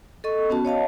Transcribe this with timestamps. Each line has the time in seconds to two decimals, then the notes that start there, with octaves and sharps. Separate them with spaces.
0.24 A4 D#5 C#6
0.50 B3 C#4 F#4 A5
0.65 C#5 D#5 F5 A5